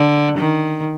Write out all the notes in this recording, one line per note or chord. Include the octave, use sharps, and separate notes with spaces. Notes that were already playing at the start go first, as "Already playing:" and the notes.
Already playing: D3
D#3